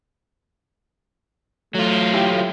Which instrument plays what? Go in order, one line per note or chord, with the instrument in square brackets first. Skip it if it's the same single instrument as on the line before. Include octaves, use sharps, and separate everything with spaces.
[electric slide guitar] F#3 F4 [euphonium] A3
[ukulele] E4 G4 G5